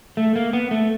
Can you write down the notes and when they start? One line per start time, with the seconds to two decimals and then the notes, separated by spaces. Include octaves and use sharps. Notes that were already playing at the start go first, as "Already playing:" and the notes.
0.17 A3
0.36 A#3
0.53 B3
0.71 A3